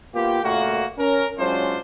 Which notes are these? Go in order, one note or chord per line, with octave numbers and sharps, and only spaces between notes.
A#3 B3 F4 G4
A#2 C#3 A3 A#3 F4 F#4
C#4 A#4
F#3 G#3 C#4 D4 F4 C5